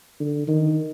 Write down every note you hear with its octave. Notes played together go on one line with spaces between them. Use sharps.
D3
D#3